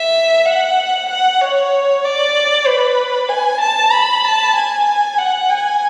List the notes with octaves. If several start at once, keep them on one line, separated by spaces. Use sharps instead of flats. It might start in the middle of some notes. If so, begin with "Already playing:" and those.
Already playing: E5
F#5
F#5
C#5
D5
B4
G#5
A5
B5
A5
G#5
F#5
G#5